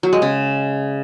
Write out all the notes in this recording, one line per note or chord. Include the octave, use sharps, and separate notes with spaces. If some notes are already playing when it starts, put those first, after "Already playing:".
F#3
G#3
C#3